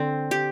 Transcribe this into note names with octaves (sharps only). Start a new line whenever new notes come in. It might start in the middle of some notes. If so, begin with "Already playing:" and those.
Already playing: D3 C4
G4